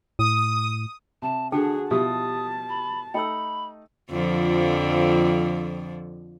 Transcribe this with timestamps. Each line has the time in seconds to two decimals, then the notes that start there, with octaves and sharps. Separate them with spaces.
0.19 A2 D#6
1.22 C3 A5
1.52 D3 D4 F#4 G#4 A4 G5 A5
1.91 B2 F3 E4 G4 A5 D#6
2.69 B5
3.14 A3 D#4 G5 A5 B5 E6
4.10 F2 D3 F3